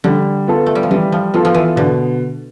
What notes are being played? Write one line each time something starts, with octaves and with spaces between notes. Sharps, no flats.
D3 G3
B3 F4 A4
A3
G3
F3
E3 G3
F3
F3 B3 F4 A4
F3
E3
B2 D3